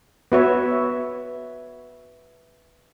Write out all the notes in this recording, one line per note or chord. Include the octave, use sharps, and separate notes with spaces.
B3 F#4 B4 C#5 E5